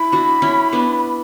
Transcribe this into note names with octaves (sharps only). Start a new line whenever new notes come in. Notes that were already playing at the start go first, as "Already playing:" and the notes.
Already playing: E4 B5
D4 F#4
C#4 E4
B3 D4